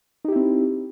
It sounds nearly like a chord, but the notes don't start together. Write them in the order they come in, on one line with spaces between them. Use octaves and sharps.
D#4 G4 E4 C4